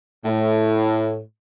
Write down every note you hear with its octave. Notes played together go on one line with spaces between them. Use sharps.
A2